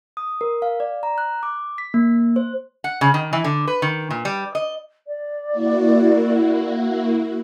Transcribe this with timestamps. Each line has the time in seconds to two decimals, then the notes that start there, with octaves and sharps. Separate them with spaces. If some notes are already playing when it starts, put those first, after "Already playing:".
0.17 D#6
0.41 A#4
0.62 F5
0.80 D5
1.03 A#5
1.18 F#6
1.43 D6
1.78 B6
1.94 A#3
2.36 C5
2.84 F#5
3.01 C#3
3.14 D#3
3.33 E3
3.44 D3
3.67 B4
3.82 D#3
4.10 A#2
4.25 G3
4.55 D#5
5.07 D5
5.48 A#3 E4 F#4